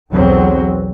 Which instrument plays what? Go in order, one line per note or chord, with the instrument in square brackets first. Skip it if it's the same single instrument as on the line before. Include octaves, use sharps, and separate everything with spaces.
[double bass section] B1 E2 F#3 C4